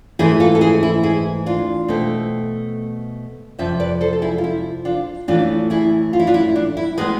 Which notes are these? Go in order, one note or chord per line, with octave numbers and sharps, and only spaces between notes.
G#2 E3 A3 E4 G#4
F4 A4
A4
E4 G#4
E4
E4 G#4
D4 F4
B2 A3 C4
F2 C3 F3 C5 E5
B4 D5
A4 C5
A4
E4 G#4
F4
E4
D4 F4
A2 E3 A3 D4 F4
E4 G#4
F4
E4
D4 F4
E4
D4
E4
A2 G#3 B3 G#4 B4